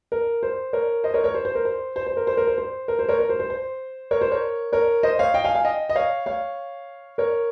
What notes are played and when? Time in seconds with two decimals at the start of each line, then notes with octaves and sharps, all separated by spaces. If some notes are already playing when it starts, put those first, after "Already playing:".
0.12 A#4
0.43 C5
0.73 A#4 C#5
1.04 C5 D#5
1.14 A#4 C#5
1.24 A#4 C#5
1.34 C5
1.45 C5
1.55 A#4
1.65 C5
1.96 C5
2.07 C5
2.17 A#4
2.27 C5
2.37 A#4
2.47 C5
2.58 C5
2.88 A#4
2.99 C5
3.09 A#4 C#5
3.19 A#4
3.29 C5
3.40 C5
3.50 C5
4.11 A#4 C#5
4.21 C5
4.32 A#4 C#5
4.72 A#4 C#5
5.03 C5 D#5
5.19 C#5 F5
5.34 D#5 G5
5.44 F5 G#5
5.54 F5 G#5
5.65 D#5 G5
5.89 D#5
5.96 C#5 F5
6.26 C#5 F5
7.18 A#4 C#5